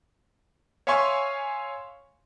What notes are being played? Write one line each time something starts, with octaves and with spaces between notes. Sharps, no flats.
C#5 E5 F5 G#5 C6 C#6